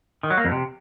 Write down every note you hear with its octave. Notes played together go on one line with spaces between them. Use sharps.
D#3
F#3
A#3
F2
C3